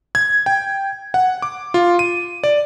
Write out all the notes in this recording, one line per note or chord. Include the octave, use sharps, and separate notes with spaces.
G#6
G5
F#5
D6
F4
D#7
D5